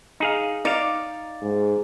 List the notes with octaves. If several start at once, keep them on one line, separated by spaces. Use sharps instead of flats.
D#4 G#4 F5
D#4 D5 F5
G#2